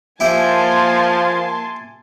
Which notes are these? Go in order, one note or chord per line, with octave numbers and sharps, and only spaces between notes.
F3 A#3 E4 G4 E5 G#5 A5 C6